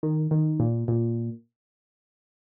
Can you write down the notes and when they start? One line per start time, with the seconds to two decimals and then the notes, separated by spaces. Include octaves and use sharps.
0.03 D#3
0.31 D#3
0.60 A#2
0.88 A#2